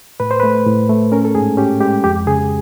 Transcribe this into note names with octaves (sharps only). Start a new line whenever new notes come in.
A2 B4
C5
A3 B4
A2
A3
C#4 A#4
A4
G#2 G#4
C#4 G4
G#3 G4
F2 G4
C#3 G#4